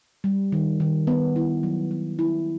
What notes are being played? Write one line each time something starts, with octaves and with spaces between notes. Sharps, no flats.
G3
D#3
D#3
B3
E4
F#3
B3
E4